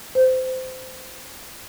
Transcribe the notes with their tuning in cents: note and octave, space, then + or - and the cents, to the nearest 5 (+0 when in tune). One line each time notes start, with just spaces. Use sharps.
C5 -20